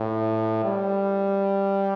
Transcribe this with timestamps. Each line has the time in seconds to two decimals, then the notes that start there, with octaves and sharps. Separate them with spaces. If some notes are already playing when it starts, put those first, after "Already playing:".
Already playing: A2
0.64 G3